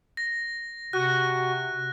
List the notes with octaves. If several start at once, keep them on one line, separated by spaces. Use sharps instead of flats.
A#6
C3 F#4 F#6